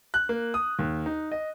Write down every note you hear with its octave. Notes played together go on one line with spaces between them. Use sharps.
F#6
A#3
D#6
D#2
D#4
D#5